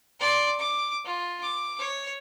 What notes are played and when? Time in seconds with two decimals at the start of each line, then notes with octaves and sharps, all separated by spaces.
0.20 D5 C6
0.60 D6
1.05 F4
1.42 D6
1.79 C#5